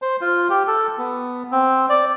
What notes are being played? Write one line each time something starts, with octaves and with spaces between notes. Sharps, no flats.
C5
F4
G4
A4
B3
C4
D5